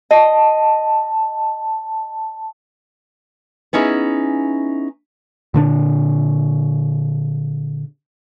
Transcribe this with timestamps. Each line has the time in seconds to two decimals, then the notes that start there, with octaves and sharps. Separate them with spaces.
0.11 D#5 A5
3.73 B3 C#4 D#4 E4 F#4 G#4
5.54 A#2 D3 D4